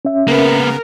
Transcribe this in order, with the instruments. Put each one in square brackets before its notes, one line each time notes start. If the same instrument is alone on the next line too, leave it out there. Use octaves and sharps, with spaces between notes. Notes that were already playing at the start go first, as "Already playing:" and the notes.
[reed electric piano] C#4 E5
[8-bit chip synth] C#3 B3 [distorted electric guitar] A#3 B4 [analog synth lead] A#4